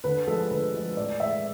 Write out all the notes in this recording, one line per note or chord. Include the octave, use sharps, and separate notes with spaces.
D3 B4
F3 G#3 A4
D3 B4
F3 G#3
A2 D5
E3 G#3 E5